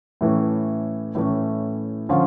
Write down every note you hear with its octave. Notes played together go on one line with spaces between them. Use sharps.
A2 E3 A3 C#4
A2 E3 A3 C#4
D3 F3 C#4 F4